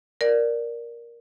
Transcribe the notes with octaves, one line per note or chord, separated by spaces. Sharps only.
A#4 D5